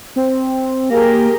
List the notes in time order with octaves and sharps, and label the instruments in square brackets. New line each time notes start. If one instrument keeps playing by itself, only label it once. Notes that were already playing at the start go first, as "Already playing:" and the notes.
[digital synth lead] C4
[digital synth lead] A#3 [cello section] G4 G#4 A#4